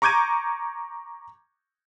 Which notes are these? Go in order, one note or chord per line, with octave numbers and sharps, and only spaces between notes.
A#5 C#6 D6 G6 G#6 D#7